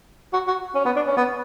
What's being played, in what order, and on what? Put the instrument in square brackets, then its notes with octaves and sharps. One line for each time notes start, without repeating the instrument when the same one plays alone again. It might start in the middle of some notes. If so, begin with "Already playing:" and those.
[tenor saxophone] F#4
F#4
C#4
B3
D4
C#4
B3